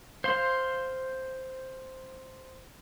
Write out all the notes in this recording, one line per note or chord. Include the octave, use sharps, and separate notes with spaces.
C5 F5 C6